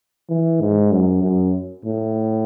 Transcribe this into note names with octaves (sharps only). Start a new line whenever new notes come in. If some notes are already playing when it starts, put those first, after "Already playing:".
E3
G#2
F#2
F#2
A2